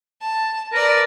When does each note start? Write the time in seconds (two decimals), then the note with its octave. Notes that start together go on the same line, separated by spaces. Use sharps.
0.21 A5
0.73 A#4 B4 D5